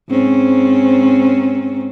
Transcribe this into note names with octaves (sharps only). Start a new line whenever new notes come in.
G#2 C4 C#4